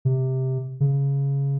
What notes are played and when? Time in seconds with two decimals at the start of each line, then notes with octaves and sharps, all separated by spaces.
0.05 C3
0.80 C#3